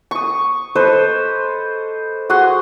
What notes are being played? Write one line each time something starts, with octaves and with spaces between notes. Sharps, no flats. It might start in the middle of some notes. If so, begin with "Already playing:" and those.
C#6 D#6
A4 B4 C5 D#5
F#4 G#4 F#5 C6